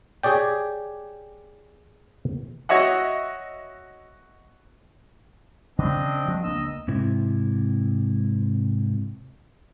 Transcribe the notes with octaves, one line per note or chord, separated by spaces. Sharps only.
G4 G#4 C#5 D5 G5
F#4 C#5 D#5 E5 F#5
C#3 C4 D4 D#5
F3
C#2 A#3 D4 D#5 E6
G#2 C3 E4